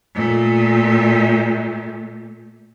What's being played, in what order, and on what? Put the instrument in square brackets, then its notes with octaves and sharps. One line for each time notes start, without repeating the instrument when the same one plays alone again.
[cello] A#2 A3